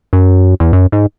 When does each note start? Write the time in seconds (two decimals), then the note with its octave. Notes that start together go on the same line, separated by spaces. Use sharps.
0.13 F#2
0.60 E2
0.73 F#2
0.92 G#2